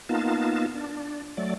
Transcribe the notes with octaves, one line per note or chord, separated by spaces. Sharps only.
A#3 B3 D#4 F4 A5
D4
F#3 A3 D5